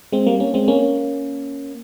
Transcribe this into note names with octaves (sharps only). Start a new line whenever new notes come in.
G#3 C4
G3 A#3
A#3 C#4
G#3 C4
A#3 C#4